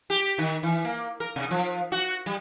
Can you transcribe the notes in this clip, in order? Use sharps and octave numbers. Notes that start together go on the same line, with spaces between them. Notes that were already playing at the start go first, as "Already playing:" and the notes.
G4
D#3
E3
A#3
A#4
C3
F3
F#4
G3